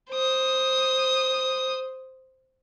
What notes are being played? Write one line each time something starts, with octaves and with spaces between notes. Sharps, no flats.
C5 D#6